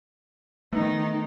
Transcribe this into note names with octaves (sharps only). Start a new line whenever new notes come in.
D#3 A3 B3 D#4